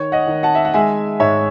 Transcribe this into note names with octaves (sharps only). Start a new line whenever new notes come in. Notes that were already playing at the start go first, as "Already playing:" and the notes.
Already playing: D#3 C#5
D#5 F#5
D#3
F#5 A5
E5
F#5
G#3 E5 G#5
G#2 C#5 E5